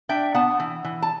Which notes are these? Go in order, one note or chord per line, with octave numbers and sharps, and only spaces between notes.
D4 E5 G5
B3 F#5 A5
E3
E3
A5